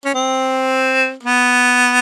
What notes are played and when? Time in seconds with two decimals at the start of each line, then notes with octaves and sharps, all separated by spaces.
0.05 C#4
0.14 C4
1.23 B3